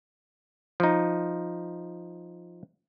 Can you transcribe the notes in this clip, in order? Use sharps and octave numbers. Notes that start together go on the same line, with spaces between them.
F3 D#4